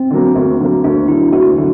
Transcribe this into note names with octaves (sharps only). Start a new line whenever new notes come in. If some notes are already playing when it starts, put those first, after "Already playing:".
Already playing: C4
D3 F#3 A#3
D2
D3 F#3 A#3
D2 D4
D3 F#3 A#3 E4
D2 F#4
D3 F#3